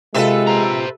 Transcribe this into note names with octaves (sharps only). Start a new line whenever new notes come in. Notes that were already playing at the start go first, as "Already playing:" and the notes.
C3 G#3 F4 A4 B4 E5
C5 A#5